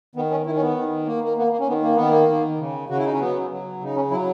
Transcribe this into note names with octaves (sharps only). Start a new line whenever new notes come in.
D#3 B3
C#4
D#3 E4
C#4
B3
D#3
A#3
A#3
A#3 B3
A#3
C#4
D#3 B3
A#3
D#3 B3
A#3
D#3
C#3
C#3 F#4
E4
D#4
C#4
F#3 B3
F#3
C#3 D#4
C#4
F#3 E4